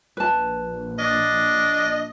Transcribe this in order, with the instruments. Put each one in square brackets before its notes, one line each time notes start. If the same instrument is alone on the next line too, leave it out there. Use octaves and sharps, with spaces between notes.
[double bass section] A#1 [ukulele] B4 A5
[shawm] D4 [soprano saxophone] D#5